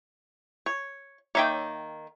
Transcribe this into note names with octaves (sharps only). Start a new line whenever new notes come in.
C#5
D#3 A#3 C#5 E5 G5